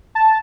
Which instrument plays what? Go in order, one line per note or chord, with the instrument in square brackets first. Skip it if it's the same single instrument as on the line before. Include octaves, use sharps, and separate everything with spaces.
[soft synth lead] A5